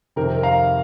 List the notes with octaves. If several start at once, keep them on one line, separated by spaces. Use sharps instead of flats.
F2 C3 D#3 C4 A#4
F5 A#5